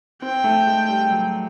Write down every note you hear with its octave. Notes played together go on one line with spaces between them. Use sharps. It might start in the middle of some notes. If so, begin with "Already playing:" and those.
C4 G5
A3
G#3
G3
F#3